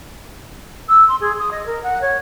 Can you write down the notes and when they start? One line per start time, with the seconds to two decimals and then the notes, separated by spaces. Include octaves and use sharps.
0.88 E6
1.08 C6
1.20 G#4
1.39 D#6
1.51 D#5
1.66 A#4
1.83 F#5
2.01 C#5